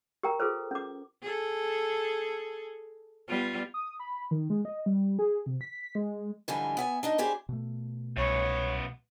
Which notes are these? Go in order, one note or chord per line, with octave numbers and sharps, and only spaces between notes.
G4 A#4 G5 A#5
F4 G#4 A4 B4 C5
C#4 D6
G#4 A4
G3 B3 F4
D#6
B5
D#3
G#3
D#5
G3
G#4
C3
B6
G#3
G#2 D3 E3 F3 G3 G#5
B3 E5 G#5
D4 D#4 D#5
E4 G4 G#4 C5 D5
B2 A3
C2 F#2 B3 C#5